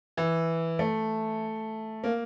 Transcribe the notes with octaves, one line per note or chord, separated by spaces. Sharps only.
E3
A3
A#3